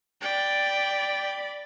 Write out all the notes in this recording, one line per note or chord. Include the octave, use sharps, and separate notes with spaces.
D5 G5 B5